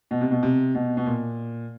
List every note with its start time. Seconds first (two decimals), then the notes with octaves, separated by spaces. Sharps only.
0.11 B2
0.21 C3
0.31 B2
0.43 C3
0.75 B2
0.97 B2
1.06 A#2